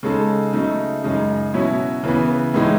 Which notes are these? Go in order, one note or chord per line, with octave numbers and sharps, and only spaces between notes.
C#3 G#3 D#4 A4
C#3 F#3 A3 D#4
F#2 C#3 G#3 D#4
B2 F#3 C#4 E4
C#3 E3 B3
A2 E3 G#3 D#4